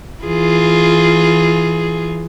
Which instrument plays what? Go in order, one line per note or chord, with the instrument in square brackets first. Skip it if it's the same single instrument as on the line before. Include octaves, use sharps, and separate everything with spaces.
[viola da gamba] E3 F4 G#4